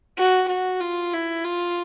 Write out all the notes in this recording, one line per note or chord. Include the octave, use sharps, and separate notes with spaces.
F#4
F#4
F4
E4
F4